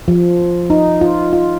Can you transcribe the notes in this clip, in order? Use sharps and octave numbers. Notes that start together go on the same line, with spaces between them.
F3
D#4
F4
F4